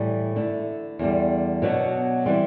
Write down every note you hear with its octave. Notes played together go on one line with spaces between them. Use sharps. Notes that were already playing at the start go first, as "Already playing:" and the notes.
Already playing: A2 E3 G3
D3 A3 E4
E2 D3 G3
B2 F#3 B3 D4 F#4
E3 G3 C4